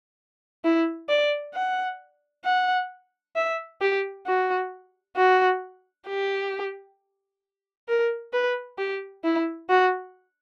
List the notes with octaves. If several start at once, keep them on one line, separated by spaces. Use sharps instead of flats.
E4
D5
F#5
F#5
E5
G4
F#4
F#4
G4
A#4
B4
G4
E4
F#4